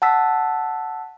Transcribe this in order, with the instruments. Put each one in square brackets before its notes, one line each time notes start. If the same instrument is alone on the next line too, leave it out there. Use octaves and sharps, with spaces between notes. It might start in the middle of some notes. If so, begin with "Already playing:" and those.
[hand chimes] F#5 A5 E6 B6